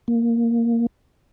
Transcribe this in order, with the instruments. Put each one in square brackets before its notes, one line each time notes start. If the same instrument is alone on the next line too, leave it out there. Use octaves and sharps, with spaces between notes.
[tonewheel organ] A#3